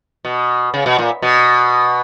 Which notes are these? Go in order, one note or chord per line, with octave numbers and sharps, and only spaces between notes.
B2
C#3
B2
A#2
B2